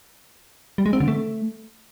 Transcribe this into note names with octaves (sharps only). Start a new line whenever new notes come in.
G3
G#3
C4
D3
A3